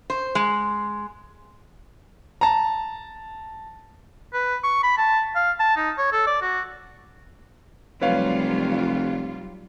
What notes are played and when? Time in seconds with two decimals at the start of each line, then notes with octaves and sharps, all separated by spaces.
0.10 C5
0.35 G#3
2.41 A5 A#5
4.33 B4
4.64 C#6
4.83 B5
4.97 A5
5.35 F5
5.60 A5
5.76 D#4
5.98 C#5
6.12 A4
6.27 D5
6.42 F#4
8.01 F1 F#3 G3 F4 B4 C#5 F5